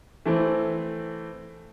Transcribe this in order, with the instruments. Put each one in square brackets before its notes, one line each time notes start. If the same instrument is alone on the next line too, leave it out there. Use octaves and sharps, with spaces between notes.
[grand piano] E3 A3 C4